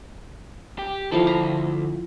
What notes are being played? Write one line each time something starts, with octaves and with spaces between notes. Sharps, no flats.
G4
D2 F3 E4 A4 F5
A#5